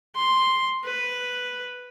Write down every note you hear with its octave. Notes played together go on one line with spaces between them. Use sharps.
C6
B4